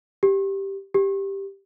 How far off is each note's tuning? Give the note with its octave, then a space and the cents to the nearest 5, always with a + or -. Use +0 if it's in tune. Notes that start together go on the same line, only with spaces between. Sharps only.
G4 -5
G4 +0